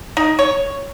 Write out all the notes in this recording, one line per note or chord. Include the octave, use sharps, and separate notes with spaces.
D#4
C#5